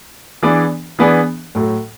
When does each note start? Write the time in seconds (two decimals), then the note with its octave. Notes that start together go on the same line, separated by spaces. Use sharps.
0.43 E3 B3 D4 G#4 D5
0.99 E3 B3 D4 G#4 D5
1.55 A2 F#3 A3